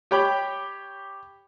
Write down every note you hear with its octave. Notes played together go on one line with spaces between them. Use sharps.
G4 C#5 G5 B5 D6